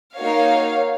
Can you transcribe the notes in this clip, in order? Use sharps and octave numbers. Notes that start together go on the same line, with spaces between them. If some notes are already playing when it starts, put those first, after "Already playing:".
A#3 D#4 F#4 C#5 F5